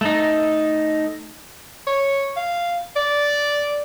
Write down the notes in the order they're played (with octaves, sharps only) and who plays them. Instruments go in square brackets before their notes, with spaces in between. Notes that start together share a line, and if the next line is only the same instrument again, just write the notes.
[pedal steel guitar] A3 D#4
[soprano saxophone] C#5
F5
D5